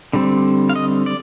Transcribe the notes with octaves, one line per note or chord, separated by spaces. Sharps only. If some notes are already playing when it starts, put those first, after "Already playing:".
D3 G3 C4
F5
D#5
D5